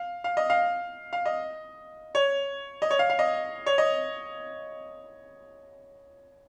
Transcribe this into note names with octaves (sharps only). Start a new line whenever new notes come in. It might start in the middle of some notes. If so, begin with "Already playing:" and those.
Already playing: F5
F5
D#5
F5
F5
D#5
C#5
D#5
C#5
F5
F5
D#5
C#5
D#5